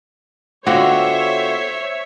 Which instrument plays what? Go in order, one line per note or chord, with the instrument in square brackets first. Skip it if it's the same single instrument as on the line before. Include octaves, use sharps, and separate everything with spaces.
[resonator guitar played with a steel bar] D3 C4 F#4 [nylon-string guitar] B3 F4 [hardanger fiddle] C5 [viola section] C#5 E5